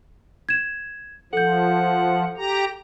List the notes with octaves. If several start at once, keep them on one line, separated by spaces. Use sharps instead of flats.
G#6 E7
F3 A4 F#5 G6
G4 A#5